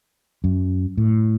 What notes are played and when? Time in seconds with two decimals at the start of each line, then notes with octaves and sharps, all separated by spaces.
0.44 F#2
0.97 A2